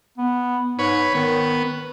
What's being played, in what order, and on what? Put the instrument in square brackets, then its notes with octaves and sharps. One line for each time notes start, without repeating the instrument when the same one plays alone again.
[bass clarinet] B3
[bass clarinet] G#2 [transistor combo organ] B4 C#5
[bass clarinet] D#3 [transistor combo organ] B3